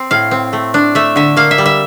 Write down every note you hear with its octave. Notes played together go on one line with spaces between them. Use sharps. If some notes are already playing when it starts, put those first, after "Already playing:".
Already playing: C4
A2 F5
C4
A3
D4
A3 E5
D3 E5
A#3 F5
E5
G3
E5